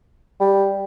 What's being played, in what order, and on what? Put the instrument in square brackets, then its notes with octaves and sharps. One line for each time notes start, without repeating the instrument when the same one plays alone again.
[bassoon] G3